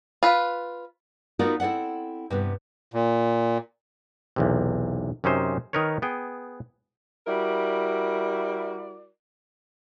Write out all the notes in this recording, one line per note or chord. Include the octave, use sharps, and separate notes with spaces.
F4 B4
B3 D#4 F4 F#4 A#4 D5
C4 E4 A4 D5 F#5
G2 C3 B3
A#2
B1 E2 C3
F#2 C3 C#4 D#4 C5
D#3 D#4 A#4 B4 C#5
B3 G#4 G5
G3 E4 F#4 A#4 D5